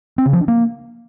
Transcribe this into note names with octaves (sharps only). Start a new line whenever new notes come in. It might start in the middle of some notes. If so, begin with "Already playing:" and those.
C4
C#3
F3
D4
A#3